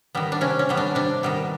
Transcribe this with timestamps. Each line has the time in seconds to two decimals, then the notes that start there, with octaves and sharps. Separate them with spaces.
0.15 D#3 G3 B3
0.32 D4
0.41 C3 C#4
0.59 C#4
0.69 D#3 G3 B3
0.77 D4
0.95 C3 D4
1.23 D#3 G3 B3